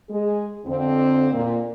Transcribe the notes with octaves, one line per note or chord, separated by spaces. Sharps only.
G#3 G#4
F2 D3 C4
A#2